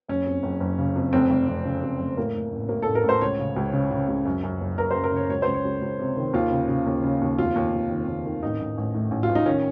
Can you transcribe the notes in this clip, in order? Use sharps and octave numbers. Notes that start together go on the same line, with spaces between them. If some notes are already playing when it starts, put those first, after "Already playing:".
F#1 C#4
F2
F#1
F#1
C#3
F2
F1 C4
F1
F1
C#3
F2
F1
A2 A#3
A2
A1
A2 A#3
A4
A1
A#4
A1
C5
C#2 C#5
C#3
C#2
C#3
C#3
C#2
F#2
F#2
F#1
F#1 A#4
C5
F#2
A#4
C#3 C#5
C#2 C#5
C#2 C5
C#5
C#2
C#2
C3
D#3
D#2 F4
C#3
C#3
D#2
C#3
D#2
F1 F4
D#2
D#2
D#3
D#2
D#3
A1 D#4
A1
A1
A2
A1
F4
A1
D#4
D#3 C#4